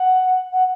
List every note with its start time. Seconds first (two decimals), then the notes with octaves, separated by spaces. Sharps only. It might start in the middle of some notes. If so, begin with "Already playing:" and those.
Already playing: F#5
0.52 F#5